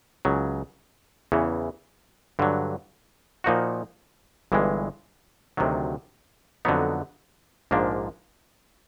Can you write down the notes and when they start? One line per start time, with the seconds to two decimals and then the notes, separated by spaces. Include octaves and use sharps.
0.25 C#2 C#3 F#3
1.32 E2 C#3 E3
2.39 G2 D3 F#3
3.44 A#2 F3 A#3 D#4 F#4
4.52 G1 G2 E3 G#3
5.57 D2 C3 D#3 F#3
6.65 F2 D3 F#3 B3 D#4
7.71 A#1 G#2 F3 A#3 D4